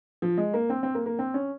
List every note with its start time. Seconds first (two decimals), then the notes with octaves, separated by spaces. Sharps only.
0.22 F3
0.38 G#3
0.54 A#3
0.70 C4
0.83 C4
0.95 A#3
1.06 A#3
1.19 C4
1.34 C#4